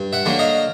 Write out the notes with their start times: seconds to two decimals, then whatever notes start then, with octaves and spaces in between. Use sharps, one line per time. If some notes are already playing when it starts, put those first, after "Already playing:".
Already playing: G2
0.13 E5 F#5
0.26 D3 F#3 A#3
0.39 D#5 F5